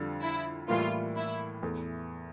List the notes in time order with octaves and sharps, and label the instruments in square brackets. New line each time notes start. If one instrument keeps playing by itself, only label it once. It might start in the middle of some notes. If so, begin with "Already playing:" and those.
Already playing: [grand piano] F2 D3 G3
[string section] E4
[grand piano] A2 E3 G3 A#3 [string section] F4
[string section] E4
[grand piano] E2 E3 A3